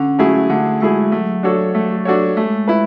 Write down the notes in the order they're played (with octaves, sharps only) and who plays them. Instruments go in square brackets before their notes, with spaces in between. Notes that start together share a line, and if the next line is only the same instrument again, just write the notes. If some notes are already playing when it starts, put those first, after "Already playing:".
Already playing: [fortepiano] D3 [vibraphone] C#4
[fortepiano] F#3 A3 E4 G#4
[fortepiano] D3 [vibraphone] A3
[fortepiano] F#3 A3 E4 G#4 [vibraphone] G#3
[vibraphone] F#3 [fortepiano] A3
[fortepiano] D4 F#4 A4 C#5
A3
D4 F#4 A4 C#5
[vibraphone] G#3 [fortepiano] A3
[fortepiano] E4 B4